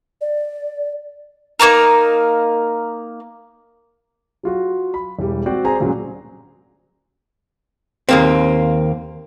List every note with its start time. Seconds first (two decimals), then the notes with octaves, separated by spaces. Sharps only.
0.21 D5
1.59 A#3 D4 D#4 A#4
4.43 F#3 F4 F#4
4.94 B5
5.19 E1 G3
5.46 C4 F#4 C5 D5 G5
5.64 C4 G#4 C5 D5 G#5 A#5
5.80 D2 A#2 C#3 F#3 G#3
8.09 D#2 A#3 C4